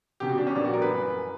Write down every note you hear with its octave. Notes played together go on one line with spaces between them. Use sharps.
E1 E2 C#3 G4
F#4
D4
C#4
A#1 A#2 G3 B3 D4
F#4
A#4
B4
F#2 E3 A#3